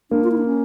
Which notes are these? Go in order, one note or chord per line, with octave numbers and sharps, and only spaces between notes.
A#3 D4
F4
E4
D4
C#4